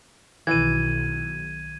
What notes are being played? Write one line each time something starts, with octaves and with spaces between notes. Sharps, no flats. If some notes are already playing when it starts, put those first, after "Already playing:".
B1 D#3 E3 G#6 D#7